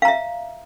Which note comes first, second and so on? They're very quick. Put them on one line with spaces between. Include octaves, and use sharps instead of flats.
F5 A#5 E5